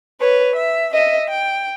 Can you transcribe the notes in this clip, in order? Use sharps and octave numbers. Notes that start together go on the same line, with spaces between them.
B4 C#5
E5
D#5 E5
G5